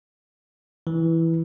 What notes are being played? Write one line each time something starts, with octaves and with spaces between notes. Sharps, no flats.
E3